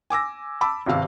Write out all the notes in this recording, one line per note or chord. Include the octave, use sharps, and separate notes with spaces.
G#5 D6 E6 A#6
A5 B5 D6 E6
G#1 G2 C3 F5 E6